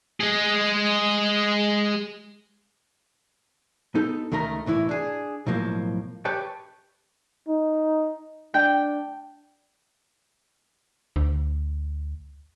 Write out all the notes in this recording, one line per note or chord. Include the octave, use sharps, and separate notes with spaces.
G#3 G#4
B3 D#4 A4
C#2 D#3 A3 A#4 A#5
C2 A2 E3 E4
D4 G#4
B1 A2 F3 A#3
G4 B4 C#5 G5 A5
D#4
D4 G5
D2